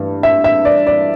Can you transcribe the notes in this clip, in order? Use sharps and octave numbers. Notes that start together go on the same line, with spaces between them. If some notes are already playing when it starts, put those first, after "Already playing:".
Already playing: G2 E3 A3
E5
E5
D5
D5